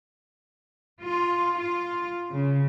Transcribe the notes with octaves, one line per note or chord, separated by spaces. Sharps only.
F4
F4
C#3